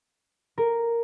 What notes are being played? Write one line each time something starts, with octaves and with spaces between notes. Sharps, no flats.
A#4